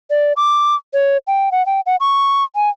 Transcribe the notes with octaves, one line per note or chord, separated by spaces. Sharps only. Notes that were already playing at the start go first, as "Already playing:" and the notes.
D5
D6
C#5
G5
F#5
G5
F#5
C#6
G#5